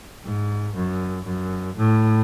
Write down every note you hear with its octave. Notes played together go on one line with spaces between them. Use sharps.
G#2
F#2
F#2
A2